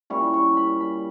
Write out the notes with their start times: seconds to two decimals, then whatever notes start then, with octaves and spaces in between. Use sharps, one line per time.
0.10 A#2 G3 C#4 E4 C#6
0.34 C#6
0.57 B5
0.80 B5